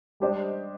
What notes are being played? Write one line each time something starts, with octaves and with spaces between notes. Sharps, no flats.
G3 D4 G4 C5 D#5